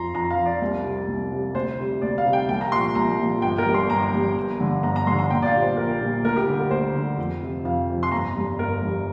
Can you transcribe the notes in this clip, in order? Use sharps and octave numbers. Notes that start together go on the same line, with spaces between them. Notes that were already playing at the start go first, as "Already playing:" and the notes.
Already playing: F2 F3 A#5 C6
F2 A#5
F5
F3
D5
C2
C3 G3
C2
C3 G3
D2 C5
C3 G3
D2 D5
F5
C3 G3
G5
C2 G5
A#5
A#2 F3 C6
C2 A#5
A#2 F3
G1 G5
A#4
G2 G3
C6
G1 A#5
G2 G3
G1
G2 D3
G1 A#5
A#5
G2 D3 C6
A#5
A#1 G5
D5
F5
A#2 G3
C5
A#1 A#4
A#2 G3
D2 A#4
G4
D3 G3
A#4
D2 C5
D3 G3
F2
C3 F3
F2 F5
C3 F3
C6
G1 A#5
G2 G3
G1 A#4
G2 G3